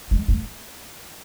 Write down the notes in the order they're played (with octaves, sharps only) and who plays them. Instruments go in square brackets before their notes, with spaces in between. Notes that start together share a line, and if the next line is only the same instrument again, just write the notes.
[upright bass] G#3
A3